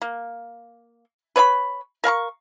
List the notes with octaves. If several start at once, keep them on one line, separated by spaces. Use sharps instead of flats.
A#3
B4 C#5 D5 B5
A#4 F5 A#5 C#6